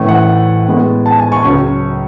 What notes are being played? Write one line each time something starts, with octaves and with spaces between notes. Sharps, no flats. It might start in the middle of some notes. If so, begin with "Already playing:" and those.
Already playing: A2 E3 A3 C#4
F#5
A2 G#3 B3
A5
G#5
C#6
C#2 C#3 F#3 C#4